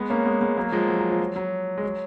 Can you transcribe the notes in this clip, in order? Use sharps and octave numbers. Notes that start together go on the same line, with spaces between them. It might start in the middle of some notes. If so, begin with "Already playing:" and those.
Already playing: G#3 B3
A#3 C#4
G#3 B3
G#3 B3
F#3 A#3
F3 G#3
F#3
F#3
F3
F#3
F#3
G#3
F#3